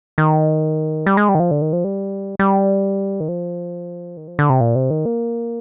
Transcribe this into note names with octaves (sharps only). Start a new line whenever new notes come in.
D#3
G3
G#3
G3
D#3
F3
D3
D#3
F3
G3
G3
D#3
F3
D#3
F3
D3
C3
A#2
C3
D#3
A#3